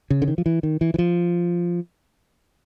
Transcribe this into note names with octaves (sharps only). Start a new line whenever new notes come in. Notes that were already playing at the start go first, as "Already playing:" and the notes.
C#3
D3
D#3
F3
E3
D#3
E3
E3
F3